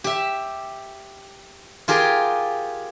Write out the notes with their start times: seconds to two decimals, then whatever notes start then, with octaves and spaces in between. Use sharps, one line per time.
0.04 G4 E5
1.88 F4 G4 G#4 A#4